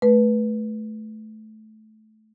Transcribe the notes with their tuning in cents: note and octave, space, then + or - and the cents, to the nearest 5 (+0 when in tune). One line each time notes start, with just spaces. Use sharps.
A3 -20 B4 -15